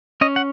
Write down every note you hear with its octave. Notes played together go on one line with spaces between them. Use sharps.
C#4 D#5
F#5